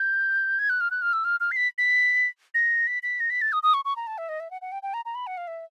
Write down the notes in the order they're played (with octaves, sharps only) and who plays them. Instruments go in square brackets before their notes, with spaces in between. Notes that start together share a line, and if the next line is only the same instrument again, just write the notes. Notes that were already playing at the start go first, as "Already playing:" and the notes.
Already playing: [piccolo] G6
G#6
F#6
F6
F#6
F6
E6
F6
F6
C7
B6
B6
A#6
B6
B6
A#6
B6
A6
D#6
D#6
C#6
C#6
A#5
A5
E5
D#5
E5
F#5
F#5
G5
G5
A#5
A#5
B5
F#5
F5
E5